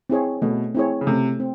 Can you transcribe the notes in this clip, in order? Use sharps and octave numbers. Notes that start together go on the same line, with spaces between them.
C4 E4 G#4 C#5
B2 A3
C4 E4 G#4 C#5
C#3
C3 A3
C4